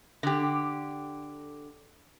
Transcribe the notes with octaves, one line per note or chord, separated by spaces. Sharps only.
D3 G4